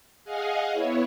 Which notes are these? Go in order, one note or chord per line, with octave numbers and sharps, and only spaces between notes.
G#4 D#5 F5 F#5 G#5
B3 E4 C#5